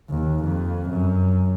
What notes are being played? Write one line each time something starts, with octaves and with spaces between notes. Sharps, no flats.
D#2
F2
F#2